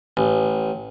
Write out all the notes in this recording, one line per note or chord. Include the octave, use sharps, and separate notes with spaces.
A1